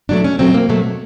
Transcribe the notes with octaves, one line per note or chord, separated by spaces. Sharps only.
B2 F#3 A3 D4
C#4
B2 F#3 A3 C4
A#3
B2 F#3 A3